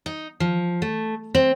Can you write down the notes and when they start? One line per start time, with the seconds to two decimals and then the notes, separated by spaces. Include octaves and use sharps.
0.06 D#4
0.40 F3
0.82 A3
1.35 C4